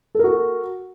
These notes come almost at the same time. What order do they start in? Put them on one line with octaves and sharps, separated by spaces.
A4 A#4 F#4